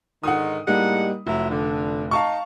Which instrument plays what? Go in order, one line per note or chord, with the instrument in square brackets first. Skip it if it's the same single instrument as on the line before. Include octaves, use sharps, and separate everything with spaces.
[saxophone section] G#2 D3 D#3 [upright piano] F#5 D#6
[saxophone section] A2 G#3 F#5 [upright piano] G3 A#3 D#4
[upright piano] F1 [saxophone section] F#3 E4
[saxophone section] D3
[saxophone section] D#4 [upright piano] F5 A5 C#6